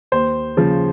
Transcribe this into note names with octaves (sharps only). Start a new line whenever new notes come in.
D#2 C5
C#3 F3